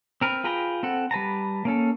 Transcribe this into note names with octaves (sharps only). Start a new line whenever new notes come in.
C4 A#4 B4
F4 G#4 B4 G5 A#5
C4 A4 F#5
G3 B4 A5 A#5
A#3 C#4 A4